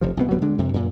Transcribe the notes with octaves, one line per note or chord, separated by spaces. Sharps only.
F1 C3 F3
C2 B2 B3
D1 G2 F#3 B3
D3 G#3 D4
F2 C3
F#2 A#2